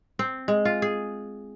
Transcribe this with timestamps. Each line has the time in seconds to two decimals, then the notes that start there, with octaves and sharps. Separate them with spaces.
0.19 C4
0.48 G#3
0.65 F4
0.82 G#4